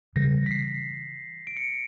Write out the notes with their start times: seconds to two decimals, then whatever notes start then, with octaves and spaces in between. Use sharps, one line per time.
0.16 C#3 E3 G3 A#6
0.46 B6
0.51 C7
1.47 D7
1.57 C#7